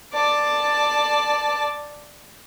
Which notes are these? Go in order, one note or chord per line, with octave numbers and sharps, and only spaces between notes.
D5 A5